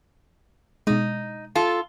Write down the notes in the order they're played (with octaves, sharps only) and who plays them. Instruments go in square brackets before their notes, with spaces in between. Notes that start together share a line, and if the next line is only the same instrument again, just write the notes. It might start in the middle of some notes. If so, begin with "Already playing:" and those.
[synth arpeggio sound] B2 G#3 [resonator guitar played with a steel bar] D#4
[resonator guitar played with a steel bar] F4 A4